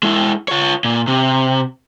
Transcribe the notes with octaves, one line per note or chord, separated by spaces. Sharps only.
G#3 E4
F4 C#5
A#2
C3